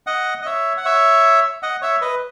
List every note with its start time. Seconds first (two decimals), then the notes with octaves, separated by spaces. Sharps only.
0.07 D#5 F#5
0.42 D#5
0.46 C#5 E5
0.77 F#5
0.85 C#5 E5
1.63 D#5 F#5
1.82 C#5 E5
2.01 B4 D#5